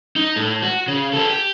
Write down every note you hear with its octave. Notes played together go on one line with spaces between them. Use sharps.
D#4
A2
F#4
C#3
G4 A4
G4